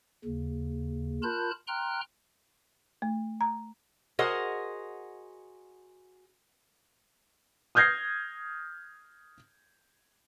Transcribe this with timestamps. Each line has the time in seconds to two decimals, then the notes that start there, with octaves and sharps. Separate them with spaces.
0.24 D#2 C#3
1.23 F4 A#4 A5 B5 F#6 G6
1.67 G5 A#5 C6 F6 F#6
3.02 A3
3.41 A#5
4.19 F#4 G#4 A#4 C5 D#5 F#5
7.75 D#6 F6 G6 G#6 A#6 C7